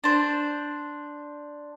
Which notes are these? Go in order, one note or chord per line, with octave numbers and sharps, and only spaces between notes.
D4 C5